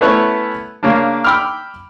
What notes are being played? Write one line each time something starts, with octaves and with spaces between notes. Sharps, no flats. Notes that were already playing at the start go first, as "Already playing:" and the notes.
A3 B3 C#4 E4 B4 C#5
C#3 A#3 C#4 D4
G5 B5 D6 E6 F6